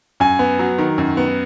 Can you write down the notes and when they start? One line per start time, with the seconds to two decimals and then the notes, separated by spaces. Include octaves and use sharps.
0.20 F#2 G#5
0.39 B3
0.59 F#3
0.78 D#3
0.98 F#2
1.17 B3